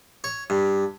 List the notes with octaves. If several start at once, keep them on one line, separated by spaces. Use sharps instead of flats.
C#5
G2